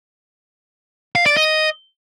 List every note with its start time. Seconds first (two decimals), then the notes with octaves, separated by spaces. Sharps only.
1.16 F5
1.26 D5
1.37 D#5